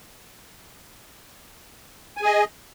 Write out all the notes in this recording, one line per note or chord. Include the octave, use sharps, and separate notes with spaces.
G#4 D#5 G#5